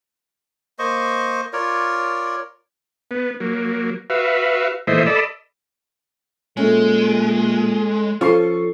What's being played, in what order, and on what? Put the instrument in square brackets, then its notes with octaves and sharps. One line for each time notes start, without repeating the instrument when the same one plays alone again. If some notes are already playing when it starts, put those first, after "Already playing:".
[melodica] A#3 C5 D#5 C#6
F4 A#4 C#5 D5
[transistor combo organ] B3
F#3 A#3
F#4 B4 E5 F5
A#2 E3 A3 C5 D#5 E5
A4 D5 D#5 B5 E6
[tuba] A#2 [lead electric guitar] G#3 [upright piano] A3 C#4
[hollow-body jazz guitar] F3 C#4 F4 [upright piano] A4 C#6 C7